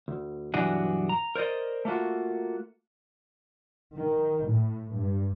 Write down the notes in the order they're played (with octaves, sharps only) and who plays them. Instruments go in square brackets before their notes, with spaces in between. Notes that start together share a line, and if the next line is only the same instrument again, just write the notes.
[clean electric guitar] D2
B1 G2 E3 D4 F#4 G#4
A#5
A#4 C5 D5 D#5
A3 A#3 F4 F#4
[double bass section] D#3
A2
G2